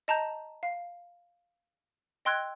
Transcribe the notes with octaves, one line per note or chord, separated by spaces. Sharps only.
D#5 A5 A#5 G6
F5
D#5 G5 C6 E6 F#6 G#6